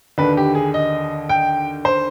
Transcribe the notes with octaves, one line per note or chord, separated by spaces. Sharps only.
D#2 D3 B4
G4
G#4
D#5
G5
C5